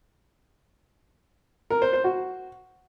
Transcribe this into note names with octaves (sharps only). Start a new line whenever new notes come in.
A#4
C5
C5
F#4